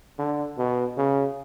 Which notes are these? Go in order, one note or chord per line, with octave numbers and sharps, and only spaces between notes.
D3
B2
C#3